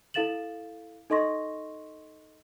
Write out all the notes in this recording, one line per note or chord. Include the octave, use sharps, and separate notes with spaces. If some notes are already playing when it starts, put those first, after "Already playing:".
E4 A4 F5 A6 E7 F#7
D#4 A4 D#5 C6 C#6 A#6